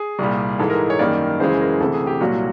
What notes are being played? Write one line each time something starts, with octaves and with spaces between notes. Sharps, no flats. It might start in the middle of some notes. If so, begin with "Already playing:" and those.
Already playing: G#4
C2 A#2 G3
G#2 E3 G#3 A4
A#4
C#5
F#2 D#3 G3 A#3 D5
F#2 C#3 E3 G#3 C5
A#4
D2 C3 E3 A4
G#4
G4
C2 A#2 F#3 A#3 F#4